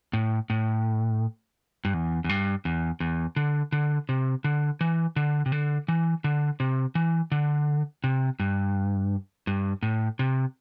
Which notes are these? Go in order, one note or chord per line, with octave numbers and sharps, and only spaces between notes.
A2
A2
G2
E2
E2
G2
E2
E2
D3
D3
C3
D3
E3
D3
C3
D3
E3
D3
C3
E3
D3
C3
G2
G2
A2
C3